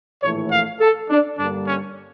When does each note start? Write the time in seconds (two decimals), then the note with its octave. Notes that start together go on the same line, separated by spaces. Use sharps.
0.22 A#1 A2 E3 A3 C#5
0.51 F5
0.80 A4
1.10 D4
1.38 G2 D3 G3 A#3 D4
1.67 C#4